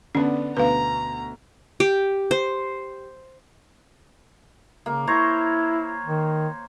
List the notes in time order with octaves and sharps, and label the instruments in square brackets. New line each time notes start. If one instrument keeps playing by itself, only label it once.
[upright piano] D3 B3 D4 [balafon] C#4
[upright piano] D2 B2 [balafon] B4 F5 [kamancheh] A#5
[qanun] G4
C5
[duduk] C#3 [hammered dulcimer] A#3
[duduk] E4 [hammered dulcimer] C5 C#5 A#5
[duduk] D#3